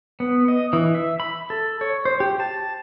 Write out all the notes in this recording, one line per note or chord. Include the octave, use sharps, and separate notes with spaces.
B3
D#5
E3
E5
B5
A4
C#5
C5
G4
A5